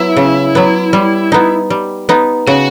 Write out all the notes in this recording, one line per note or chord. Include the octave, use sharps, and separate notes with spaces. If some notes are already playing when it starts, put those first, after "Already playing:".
Already playing: F#3 B3 E4
C#3
F#3 B3
G3
B3 D#4
G3
B3 D#4
C#3 F#4